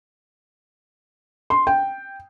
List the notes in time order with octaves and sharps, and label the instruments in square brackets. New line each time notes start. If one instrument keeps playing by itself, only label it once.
[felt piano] C6
G5